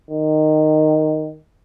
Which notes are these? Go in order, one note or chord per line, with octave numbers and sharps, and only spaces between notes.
D#3